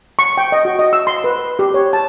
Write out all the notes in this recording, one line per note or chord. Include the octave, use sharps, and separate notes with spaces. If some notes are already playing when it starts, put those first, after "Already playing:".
C#6
G5
D#5
F#4
D#5
E6
C6
B4
G4
C#5
A5